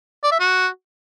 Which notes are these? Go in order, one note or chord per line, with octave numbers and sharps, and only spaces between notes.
D5
E5
F#4